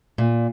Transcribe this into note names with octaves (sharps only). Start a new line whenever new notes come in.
A#2